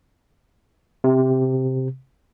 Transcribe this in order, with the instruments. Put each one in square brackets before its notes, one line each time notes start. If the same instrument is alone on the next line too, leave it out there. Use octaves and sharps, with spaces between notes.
[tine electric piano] C3